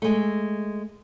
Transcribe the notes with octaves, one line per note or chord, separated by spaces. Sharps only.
G#3 A3